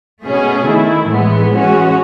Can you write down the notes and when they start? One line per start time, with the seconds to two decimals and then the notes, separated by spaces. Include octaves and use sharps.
0.24 B2 A3 C#4 G#4
0.66 D#3 A3 E4
1.09 A2 E3 G#3 B3
1.51 E3 G#3 C#4 F#4